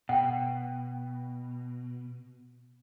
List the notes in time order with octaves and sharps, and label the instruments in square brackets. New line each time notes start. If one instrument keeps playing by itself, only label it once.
[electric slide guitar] B2 [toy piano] F#5 G5